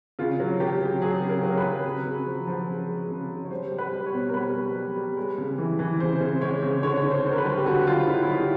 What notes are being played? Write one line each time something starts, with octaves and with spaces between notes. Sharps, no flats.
C#3 F4
F#3
F#3 G4
C#3
F#3 G#4
C#3
A#4
F#3
B4
F#3
C#3
C#3
F3
F3
C#3
G#3
C#3
C#3
C#5
G3 C5
G3
B4
G3
C#5
B2
A#4
G3 B4
G3
G3
G3
G#3
C#3
E3
E3
C#3 C5
C#3
G#3 C#5
C#3
D3 C#5
C#5
D3
C5
D3
A#4
B4
G3
G4
D3 F#4
G3 F4
D3 E4
E4
G3 D#4